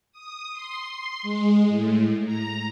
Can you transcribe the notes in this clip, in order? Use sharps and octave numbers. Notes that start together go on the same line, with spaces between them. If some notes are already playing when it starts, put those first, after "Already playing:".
D#6
C6
G#3
A2
A#5